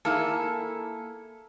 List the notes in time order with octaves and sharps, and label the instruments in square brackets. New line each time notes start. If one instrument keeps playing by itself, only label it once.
[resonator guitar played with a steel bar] A#3 E4 G#4 [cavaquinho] A4